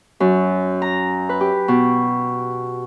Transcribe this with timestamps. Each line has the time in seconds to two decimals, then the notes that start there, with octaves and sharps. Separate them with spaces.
0.20 F#2
0.82 A#5
1.29 B4
1.40 G4
1.68 B2